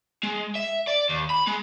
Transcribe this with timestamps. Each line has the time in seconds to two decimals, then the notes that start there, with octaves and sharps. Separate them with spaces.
0.23 G#3
0.55 E5
0.87 D5
1.09 D#2
1.30 B5
1.47 G#3